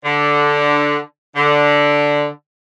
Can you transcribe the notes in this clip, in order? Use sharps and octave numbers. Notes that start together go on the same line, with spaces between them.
D3
D3